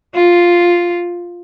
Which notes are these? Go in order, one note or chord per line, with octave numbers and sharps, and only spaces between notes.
F4